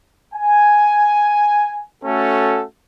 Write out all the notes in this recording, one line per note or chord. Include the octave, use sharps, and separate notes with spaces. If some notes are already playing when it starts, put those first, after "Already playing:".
G#5
A3 C#4 F#4 A4